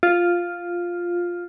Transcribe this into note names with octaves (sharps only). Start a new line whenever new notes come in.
F4